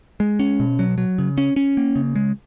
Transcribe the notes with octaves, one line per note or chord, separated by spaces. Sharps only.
G#3
C#4
B2
F#3
F#3
C#3
C#4
C#4
A#3
C#3
G#3